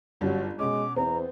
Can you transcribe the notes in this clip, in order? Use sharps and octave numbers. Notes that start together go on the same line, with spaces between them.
G1 F#2 F#3 G3
B2 G#3 C#4 D6
E2 B3 C4 A#5